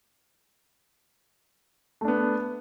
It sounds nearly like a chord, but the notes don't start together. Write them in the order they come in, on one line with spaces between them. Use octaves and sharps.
A3 D4 B3